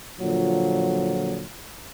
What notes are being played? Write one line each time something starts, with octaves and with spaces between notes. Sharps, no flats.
A#2 D3 F3 F#3